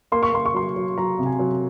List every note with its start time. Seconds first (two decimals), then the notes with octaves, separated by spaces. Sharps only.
0.12 A#3 C6
0.23 C#6
0.33 A#3 C6
0.45 C#6
0.54 F#3 C6
0.76 F#3
0.98 F#3 A#5
1.19 C3
1.26 G#5
1.39 F#3